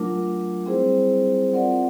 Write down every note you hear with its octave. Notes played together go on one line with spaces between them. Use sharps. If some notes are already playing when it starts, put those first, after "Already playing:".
Already playing: F#3 A3 D4 F4 A#4
G3 C4 E4 G#4 C5
C4 F4 A#4 D5 F#5